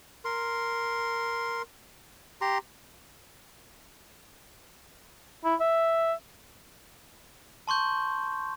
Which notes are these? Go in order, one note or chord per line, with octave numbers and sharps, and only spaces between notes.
A#4 C6
G4 A#5 C6
E4
E5
A5 C6 C#6 G6